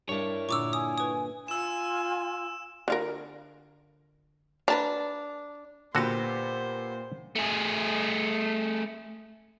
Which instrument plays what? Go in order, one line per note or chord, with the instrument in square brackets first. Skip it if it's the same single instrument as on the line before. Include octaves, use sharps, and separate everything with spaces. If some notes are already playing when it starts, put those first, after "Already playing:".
[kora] G2 D4 [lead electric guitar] E4 C#5 [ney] A#4
[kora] A#2 D3 [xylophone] C#6 D6 E6
[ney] G#5 [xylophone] D#6
[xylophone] B4 D#6
[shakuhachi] F4 [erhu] G#5 [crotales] E6 E7
[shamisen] D3 F4 A#4
[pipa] D4 [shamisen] B4 A5 A#5
[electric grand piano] A#2 [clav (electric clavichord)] D3 F#4 [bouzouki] B3 G4 [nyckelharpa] C5
[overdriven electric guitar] A3 G#4